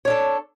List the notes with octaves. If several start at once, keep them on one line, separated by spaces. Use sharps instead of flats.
D4 A4 C#5